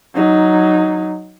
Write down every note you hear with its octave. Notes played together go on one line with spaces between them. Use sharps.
F#3 D#4